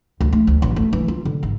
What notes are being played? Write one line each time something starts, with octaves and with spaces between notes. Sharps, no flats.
D2
A3
D2
A1
A3
E3
F4
D3
G#1